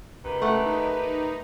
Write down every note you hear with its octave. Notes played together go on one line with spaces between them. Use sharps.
C#2 D#3 G4 B4
A3 F#5
D#4